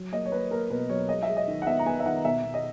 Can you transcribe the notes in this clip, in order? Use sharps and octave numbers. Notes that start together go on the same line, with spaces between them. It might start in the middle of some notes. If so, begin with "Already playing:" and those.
Already playing: F#3
A#3 D#5
C#5
A#3 B4
A#3 A#4
B2 B4
F#3 C#5
G#3 D#5
E5
G#3
D#5
D#3
F#5
B3 E5
A#5
B3 G#5
E5
D#3 F#5
B2 E5
B2
D#5